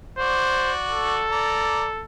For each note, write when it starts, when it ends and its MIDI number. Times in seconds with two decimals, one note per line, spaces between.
0.18 1.25 66
0.18 0.72 72
0.18 1.25 74
0.89 2.05 69
1.31 1.86 74
1.31 1.86 82